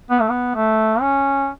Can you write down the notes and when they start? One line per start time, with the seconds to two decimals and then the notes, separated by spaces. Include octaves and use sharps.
0.10 B3
0.20 A3
0.29 B3
0.55 A3
1.01 C#4